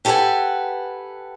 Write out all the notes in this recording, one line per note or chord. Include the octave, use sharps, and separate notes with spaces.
G4 A4 B4 C#5 F#5 G#5